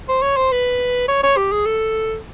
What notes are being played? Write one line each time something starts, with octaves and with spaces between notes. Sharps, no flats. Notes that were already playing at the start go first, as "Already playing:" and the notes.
C5
C#5
C5
B4
C#5
C#5
G4
G#4
A4